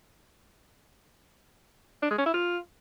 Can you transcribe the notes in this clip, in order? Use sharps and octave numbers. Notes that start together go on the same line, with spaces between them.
D4
G#3
C#4
E4
F4